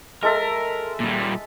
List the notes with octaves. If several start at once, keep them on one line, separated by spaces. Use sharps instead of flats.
G#3 A4 A#4 E5
A#2 G3